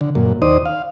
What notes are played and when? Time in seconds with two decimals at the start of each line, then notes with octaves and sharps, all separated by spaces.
0.01 D3
0.15 F#2 A#2
0.42 D#2 D#4 C5 D5 D#6
0.65 F5